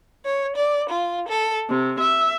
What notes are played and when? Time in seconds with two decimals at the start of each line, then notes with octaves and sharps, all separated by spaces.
0.25 C#5
0.57 D5
0.89 F4
1.28 A4
1.70 C3
2.00 E5